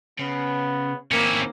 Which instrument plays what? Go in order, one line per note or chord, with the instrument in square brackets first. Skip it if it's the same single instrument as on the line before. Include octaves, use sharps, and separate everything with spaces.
[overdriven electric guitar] C#3 [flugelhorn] B3
[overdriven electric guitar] D#3 C4 [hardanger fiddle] A#3 [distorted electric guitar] C#4 E4